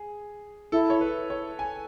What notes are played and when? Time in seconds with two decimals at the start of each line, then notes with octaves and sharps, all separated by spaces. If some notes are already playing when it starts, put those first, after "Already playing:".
Already playing: G#4
0.72 E4 A4
0.90 C#5
1.01 B4
1.30 C#5
1.59 G#5